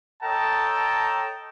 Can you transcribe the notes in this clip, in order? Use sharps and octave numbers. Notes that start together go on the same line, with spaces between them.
A4 C#5 D#5 G5 A5 A#5